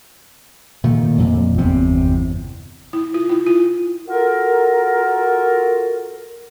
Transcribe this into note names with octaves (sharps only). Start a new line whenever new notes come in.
A#2 D#3 A3
F2 A#2
G1 E2 C3 C4
E4
F4
E4
F4
F4 F#4 A4 A#4